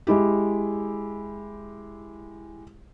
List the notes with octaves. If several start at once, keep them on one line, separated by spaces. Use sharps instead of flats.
G#3 E4 G4